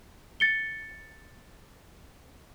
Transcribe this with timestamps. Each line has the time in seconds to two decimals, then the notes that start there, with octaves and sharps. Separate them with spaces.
0.40 A6 C#7 G7